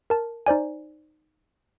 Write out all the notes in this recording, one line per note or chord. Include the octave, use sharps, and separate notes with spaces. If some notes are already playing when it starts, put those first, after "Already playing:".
A#4 A5
D#4 C5 D5 G#5